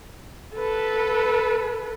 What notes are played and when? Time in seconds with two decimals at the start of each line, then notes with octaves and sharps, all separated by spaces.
0.55 A4 B4